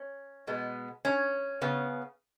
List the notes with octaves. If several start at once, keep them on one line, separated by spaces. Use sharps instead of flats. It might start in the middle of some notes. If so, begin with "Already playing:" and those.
Already playing: C#4
B2 G#3 B3
C#4
C#3 B3